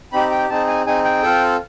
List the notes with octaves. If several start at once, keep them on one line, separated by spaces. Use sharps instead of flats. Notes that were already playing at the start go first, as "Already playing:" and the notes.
C4 D#4 G4 B5
G5
C4 D#4 G#4 A5
G#5
C4 D#4 G#4 G#5
G5
C4 F4 A4